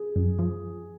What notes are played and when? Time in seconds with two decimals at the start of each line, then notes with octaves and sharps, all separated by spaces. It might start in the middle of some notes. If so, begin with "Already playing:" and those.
Already playing: G#4
0.16 F#2
0.39 F3